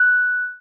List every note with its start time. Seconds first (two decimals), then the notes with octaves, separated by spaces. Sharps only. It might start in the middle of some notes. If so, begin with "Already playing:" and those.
Already playing: F#6